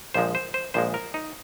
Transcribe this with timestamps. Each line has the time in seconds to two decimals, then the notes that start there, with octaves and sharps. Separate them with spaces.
0.14 A#1 A#2 F3 G#3 C5
0.35 C5
0.54 C5
0.74 A#1 A#2 F3 G#3 C5
0.94 A#4
1.14 D#4